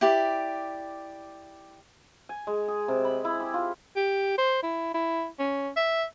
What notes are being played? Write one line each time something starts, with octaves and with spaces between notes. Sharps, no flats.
E4 G4 D5
G#5
G#3
G#4
C3
B5
E4
G4
F4
G4
C5
E4
E4
C#4
E5